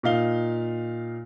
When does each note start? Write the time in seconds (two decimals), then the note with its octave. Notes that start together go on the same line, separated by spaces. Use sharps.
0.03 A#2 D#4 F5 G7